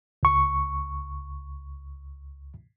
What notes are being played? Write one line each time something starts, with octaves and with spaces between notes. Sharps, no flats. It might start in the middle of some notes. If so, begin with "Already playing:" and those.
C#2 C#6